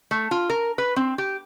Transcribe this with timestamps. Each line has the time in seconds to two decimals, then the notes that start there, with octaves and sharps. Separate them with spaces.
0.11 A3
0.31 F4
0.50 A#4
0.78 B4
0.96 C4
1.18 G4